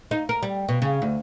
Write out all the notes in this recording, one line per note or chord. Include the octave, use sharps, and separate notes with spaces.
D#4
A#4
G3
B2
C#3
D2